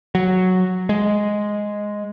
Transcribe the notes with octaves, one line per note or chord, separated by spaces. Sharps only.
F#3
G#3